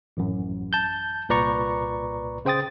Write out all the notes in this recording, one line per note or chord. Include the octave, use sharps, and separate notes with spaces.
A1 F#2
A5 G6
C2 A#2 B4 D5 A#5 C#6
C#3 C5 G5 D#6 A6